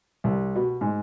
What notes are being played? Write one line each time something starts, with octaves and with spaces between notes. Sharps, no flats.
C2
B2
G#2